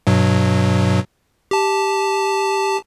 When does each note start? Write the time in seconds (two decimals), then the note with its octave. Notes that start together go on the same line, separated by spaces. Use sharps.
0.07 G2 B2 F#3
1.51 G4 A5